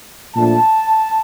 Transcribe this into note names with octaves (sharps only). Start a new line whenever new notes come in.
A#2 F3 A3 D4 F4 A5